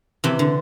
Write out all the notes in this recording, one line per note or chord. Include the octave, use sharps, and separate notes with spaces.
C3 E3
D3